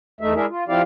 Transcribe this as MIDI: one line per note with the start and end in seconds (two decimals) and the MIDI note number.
0.21 0.34 40
0.21 0.34 57
0.21 0.34 63
0.21 0.34 76
0.35 0.46 56
0.35 0.46 62
0.35 0.46 64
0.35 0.46 68
0.35 0.46 70
0.35 0.46 76
0.49 0.64 65
0.68 0.82 53
0.68 0.82 60
0.68 0.82 64
0.68 0.82 67
0.68 0.82 74
0.68 0.82 77